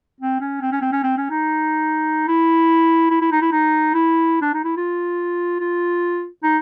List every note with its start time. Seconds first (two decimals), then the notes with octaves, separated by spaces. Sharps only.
0.21 C4
0.41 C#4
0.61 C4
0.72 C#4
0.82 C4
0.92 C#4
1.03 C4
1.17 C#4
1.30 D#4
2.28 E4
3.10 E4
3.21 E4
3.32 D#4
3.42 E4
3.52 D#4
3.94 E4
4.42 D4
4.54 D#4
4.65 E4
4.77 F4
5.59 F4
6.43 D#4